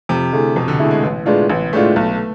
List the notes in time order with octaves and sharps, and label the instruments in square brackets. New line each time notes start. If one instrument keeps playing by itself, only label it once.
[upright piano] F2 [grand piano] C3
[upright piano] D3 A3 E4 G#4
[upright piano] F2 [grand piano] B2
[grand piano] D3
[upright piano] D3 A3 E4 G#4
[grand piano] G#3
[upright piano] A1 [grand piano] B3
[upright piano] A2 G#3 D4 F4 [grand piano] B3
[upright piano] A1 [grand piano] B3
[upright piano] A2 G#3 D4 F4 [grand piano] A3
[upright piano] B1